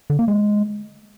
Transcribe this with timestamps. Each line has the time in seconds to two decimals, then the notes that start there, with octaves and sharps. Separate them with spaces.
0.10 D3
0.19 A#3
0.28 G#3